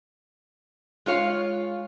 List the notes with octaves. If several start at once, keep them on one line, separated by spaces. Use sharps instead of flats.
G#3 F4 C#5 F5